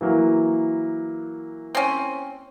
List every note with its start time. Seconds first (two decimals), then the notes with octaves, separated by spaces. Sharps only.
0.01 E3 F#3 A#3
1.75 C4 C#4